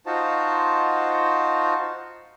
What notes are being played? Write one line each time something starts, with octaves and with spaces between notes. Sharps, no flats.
D#4 F4 F#4 C5 A5